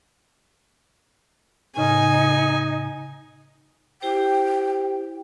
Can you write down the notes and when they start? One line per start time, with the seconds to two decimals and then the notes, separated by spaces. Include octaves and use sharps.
1.77 A2 C#3 D#4 G#5
4.02 E4 G4 C5 G5